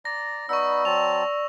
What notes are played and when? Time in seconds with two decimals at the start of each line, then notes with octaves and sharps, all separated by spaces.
0.05 D5 A#5 A#6
0.49 B3 D#4 D5 B5 C#6 E6
0.85 F#3 C4 A5 F7